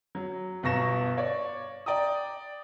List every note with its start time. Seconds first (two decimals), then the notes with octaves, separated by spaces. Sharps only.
0.15 F#3
0.63 G1 B2 A#5 C#6 A#6 E7
1.17 C#5 D5
1.86 D5 G5 A#5 D#6